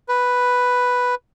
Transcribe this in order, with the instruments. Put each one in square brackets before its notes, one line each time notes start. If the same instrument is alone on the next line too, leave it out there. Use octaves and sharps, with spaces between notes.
[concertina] B4